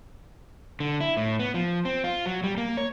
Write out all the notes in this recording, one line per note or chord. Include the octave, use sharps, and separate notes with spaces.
D3
E4
A2
B3
F3
C4
F4
F#3
G3
A#3
C#5